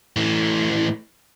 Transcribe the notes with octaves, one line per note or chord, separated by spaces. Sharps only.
A2 E3